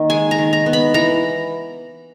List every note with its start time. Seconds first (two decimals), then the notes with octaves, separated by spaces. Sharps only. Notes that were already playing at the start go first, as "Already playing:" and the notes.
Already playing: D#3 A#3
0.10 G#3 G#5
0.31 A#5
0.38 D#3
0.53 A#5
0.66 B3
0.73 B5
0.94 E3 A#5